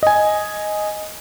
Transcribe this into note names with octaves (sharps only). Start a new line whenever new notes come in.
D#5 G#5